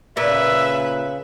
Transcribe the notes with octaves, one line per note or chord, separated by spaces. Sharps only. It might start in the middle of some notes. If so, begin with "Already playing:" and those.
A#2 C#3 B4 E5